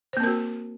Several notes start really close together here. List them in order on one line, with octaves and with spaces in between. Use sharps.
C5 A#3 C4 A#4 F#4